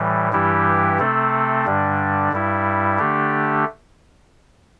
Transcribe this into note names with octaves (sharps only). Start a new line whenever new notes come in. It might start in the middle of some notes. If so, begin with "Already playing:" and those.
Already playing: A2 E3 G3
G2 E3 G3 E4 G4
C3 A3 C4 A4
G2 D3 G3 D4
G2 G3 E4
D3 A3 D4 G4